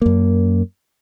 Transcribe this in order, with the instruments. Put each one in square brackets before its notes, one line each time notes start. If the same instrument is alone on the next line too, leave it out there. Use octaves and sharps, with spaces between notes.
[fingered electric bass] F#2 A#3